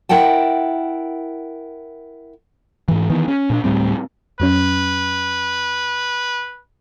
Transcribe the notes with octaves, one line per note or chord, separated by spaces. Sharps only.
E4 A#4 F#5 G5 A5
G#2 E3
D#3 E3 B3
C#4
A#2 C4 D4
D1 A2 G3 C4
F2 F#3 C#4 B4